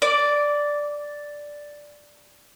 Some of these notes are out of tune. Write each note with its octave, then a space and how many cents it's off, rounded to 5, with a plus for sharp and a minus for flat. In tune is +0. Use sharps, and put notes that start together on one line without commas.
D5 +0 D6 -20